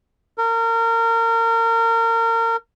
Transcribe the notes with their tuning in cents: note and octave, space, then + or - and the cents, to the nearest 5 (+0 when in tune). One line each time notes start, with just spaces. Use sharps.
A#4 -30